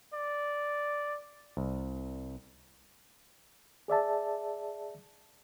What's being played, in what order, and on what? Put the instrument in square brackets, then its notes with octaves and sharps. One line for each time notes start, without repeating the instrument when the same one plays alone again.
[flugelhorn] D5
[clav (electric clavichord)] C2
[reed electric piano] G#4 D5 E5 A5